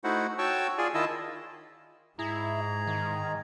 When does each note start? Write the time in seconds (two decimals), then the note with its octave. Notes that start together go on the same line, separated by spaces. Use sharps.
0.04 A3 D#4 E4 F#4 C5 F#5
0.38 F#4 C#5 G5 A5 C#6 E6
0.78 F4 G#4 D5 G#5
0.94 D#3 E4 F4 D#5 A5 E6
2.19 G#2 E4 G#4 A#5
2.87 D#3